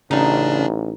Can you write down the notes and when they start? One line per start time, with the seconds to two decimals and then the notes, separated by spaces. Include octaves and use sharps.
0.11 A1 C#3 D4 D#4